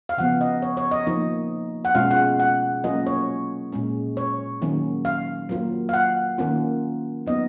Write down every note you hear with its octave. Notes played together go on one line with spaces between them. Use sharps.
F5
C#3 F3 B3 F#5
D#5
C#5
C#5
D#5
F3 A#3 D#4
F#5
B2 G#3 C#4 F4 F5
F#5
F#5
F#3 A#3 C#4 F4 D#5
C#5
A#2 G#3 C#4
C#5
D#3 F#3 A#3 C#4
F5
F#3 A#3 F4
F5
F#5
D#3 A#3 C#4 F4
F#3 B3 D#4 D#5